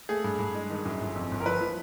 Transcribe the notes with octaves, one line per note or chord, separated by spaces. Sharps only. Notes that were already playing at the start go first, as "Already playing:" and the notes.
A3 G#4
G2
G2
G#3
D#3
F#2
G1
F2
G1
A#4
F3 B4
F3